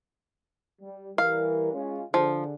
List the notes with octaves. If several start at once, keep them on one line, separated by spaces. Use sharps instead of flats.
G3
E3 G3 A#4 F5
G#3 C#4 F4
D3 F3 G#4